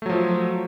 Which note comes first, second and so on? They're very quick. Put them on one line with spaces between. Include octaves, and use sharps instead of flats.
A3 F#3 F3